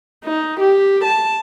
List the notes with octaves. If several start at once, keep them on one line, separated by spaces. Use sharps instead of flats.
D#4
G4
A5